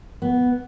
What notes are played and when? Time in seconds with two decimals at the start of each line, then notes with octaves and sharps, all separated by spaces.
0.22 B3